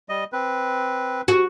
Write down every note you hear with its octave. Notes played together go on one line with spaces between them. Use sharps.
G3 D#5
C4 B4
F#4